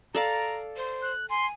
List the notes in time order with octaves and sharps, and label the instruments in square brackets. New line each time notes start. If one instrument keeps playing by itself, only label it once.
[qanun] A4 D5 F5 [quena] A#5
[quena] C5
[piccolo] F#6
[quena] G#5 [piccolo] C6